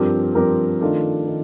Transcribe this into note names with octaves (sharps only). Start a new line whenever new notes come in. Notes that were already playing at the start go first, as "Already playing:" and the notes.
Already playing: G2 F3 C4 G4 A#4
G2 F3 C4 G4 A#4
D#3 A3 D4 F4
D#3